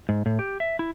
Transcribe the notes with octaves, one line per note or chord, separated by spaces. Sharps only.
G#2
A2
G4
E5
E4